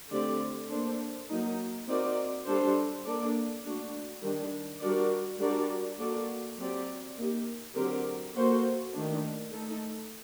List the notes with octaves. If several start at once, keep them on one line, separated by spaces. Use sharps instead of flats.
D3 A3 C4 G4 D5
A#3 D4 A4 C5
F#3 A#3 D#4
C4 D#4 F#4 A#4 D5
G3 D4 A4 C5
A#3 D4 A4 D5
A3 D4 F#4
D#3 G3 D4
G3 D4 F#4 A#4 D5
G3 D4 F#4 A#4 D5
A#3 F#4 A4 D5
F#3 C4 G4 D5
A#3 D#4 G4
D3 F#3 C4 G4 A#4
A#3 F#4 A4 C5
D#3 A3 D4
A3 D#4 A4